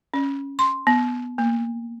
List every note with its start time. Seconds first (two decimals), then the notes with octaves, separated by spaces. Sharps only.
0.14 C#4
0.59 C6
0.87 B3
1.38 A#3